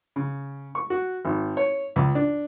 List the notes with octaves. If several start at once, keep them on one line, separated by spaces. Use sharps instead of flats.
C#3
C#6
F#4
G#1
C#5
C#2
D4